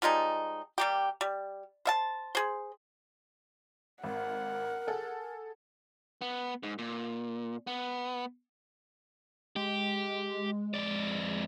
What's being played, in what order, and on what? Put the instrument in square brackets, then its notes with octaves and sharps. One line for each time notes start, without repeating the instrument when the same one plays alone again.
[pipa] F3 G3 G#3 D#4
G3 A#3 G4
G3
C5 E5 A5
G#4 C5
[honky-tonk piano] G#1 [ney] A#4 [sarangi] F#5
[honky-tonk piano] G#4 A4
[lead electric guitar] B3
G#2
A#2
B3
[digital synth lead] G#3 [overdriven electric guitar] G4
[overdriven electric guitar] F2 D5